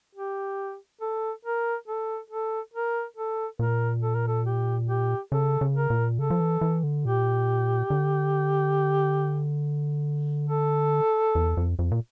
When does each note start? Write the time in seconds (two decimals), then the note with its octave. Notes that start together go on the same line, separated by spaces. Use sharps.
0.16 G4
1.01 A4
1.45 A#4
1.88 A4
2.30 A4
2.74 A#4
3.17 A4
3.59 A#2 A#4
4.02 A4
4.15 A#4
4.28 A4
4.46 G4
4.89 G4
5.32 C#3 A4
5.61 C#3
5.75 A#4
5.90 A#2
6.19 C#3 A4
6.30 F3
6.40 E3
6.61 E3
6.83 D3
7.05 A#2 G4
7.90 D3
10.49 A4
11.35 E2
11.57 F2
11.79 F2
11.92 A#2